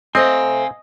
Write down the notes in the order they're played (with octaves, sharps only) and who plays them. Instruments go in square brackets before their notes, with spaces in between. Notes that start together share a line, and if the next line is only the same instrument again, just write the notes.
[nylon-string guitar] A3 C5 [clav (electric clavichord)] C4 [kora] D#5 [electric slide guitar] F5 G#5